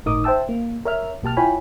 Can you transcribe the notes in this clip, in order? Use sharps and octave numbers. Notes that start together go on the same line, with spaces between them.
G1 A2 D#4 A#4 D6 D#6
C5 E5 G5 A5 E6
A#3
A#4 C#5 E5 F6
B1 A#3 G4 A5 F6
E4 F4 C#5 G5 G#5 B5